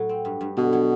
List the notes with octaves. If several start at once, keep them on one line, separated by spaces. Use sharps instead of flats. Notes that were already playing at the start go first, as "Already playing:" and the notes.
Already playing: A2 F#3 A3
C4
G2
G2
B2 D3
F#3